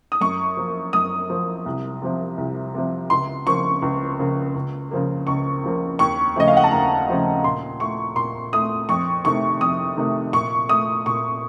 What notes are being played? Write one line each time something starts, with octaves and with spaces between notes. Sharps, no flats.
D#6
F#2 C#6
F3 A#3
F#2 D#6
F3 A#3
C2
C3 F3
C2
C3 F3
C#2 C6
C#3 F3 A#3 C#6
C#2
C#3 F3 A#3
C#2
C#3 F3 A#3
C#2 C#6
C#3 F3 A#3
D#2 C#6
C#3 F3 A3 D#5
F5
F#5
A5
D#2 A#5
C#3 F3 A3
A#2 C6
A3 C#6
A#2 C6
A3 D#6
F2 C#6
C3 D#3 A3 C#6
F2 D#6
C3 D#3 A3
A#2 C#6
A3 D#6
A#2 C#6